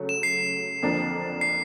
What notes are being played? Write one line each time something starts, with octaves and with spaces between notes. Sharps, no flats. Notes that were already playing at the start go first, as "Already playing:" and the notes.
Already playing: C#3 F#3 A3 C#4
E7
C7
F2 D3 F3 A#3 D4
C7